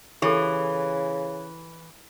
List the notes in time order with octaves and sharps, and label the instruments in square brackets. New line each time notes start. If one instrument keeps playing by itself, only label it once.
[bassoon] C#3 [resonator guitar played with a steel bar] E3 [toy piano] G4 A4